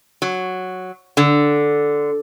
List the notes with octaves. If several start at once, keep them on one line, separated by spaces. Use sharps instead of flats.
F#3
D3